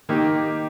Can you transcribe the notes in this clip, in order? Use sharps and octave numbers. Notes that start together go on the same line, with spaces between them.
D#3 A#3 D#4 G4